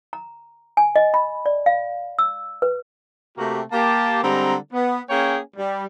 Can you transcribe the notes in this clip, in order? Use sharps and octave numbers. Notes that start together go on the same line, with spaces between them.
A#5
G#5
D#5
B5
D5
F5
E6
B4
C3 A3 A#3 F#4 G4
A#3 G4 A5
D3 G3 G#3 C4 A#5
B3
A#3 C#4 G#4 C#5 G5 G#5
G3